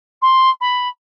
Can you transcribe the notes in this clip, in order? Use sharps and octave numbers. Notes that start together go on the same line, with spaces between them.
C6
B5